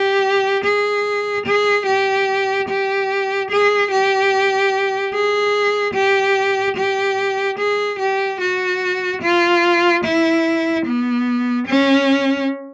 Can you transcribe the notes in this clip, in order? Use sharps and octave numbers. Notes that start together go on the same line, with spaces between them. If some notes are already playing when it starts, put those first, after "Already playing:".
Already playing: G4
G#4
G#4
G4
G4
G#4
G4
G#4
G4
G4
G#4
G4
F#4
F4
E4
B3
C#4